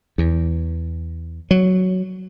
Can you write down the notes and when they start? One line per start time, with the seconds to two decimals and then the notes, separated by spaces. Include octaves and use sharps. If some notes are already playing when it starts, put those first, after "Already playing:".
0.18 E2
1.51 F#3